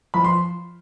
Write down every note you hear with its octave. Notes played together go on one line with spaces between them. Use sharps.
F3 B5
C6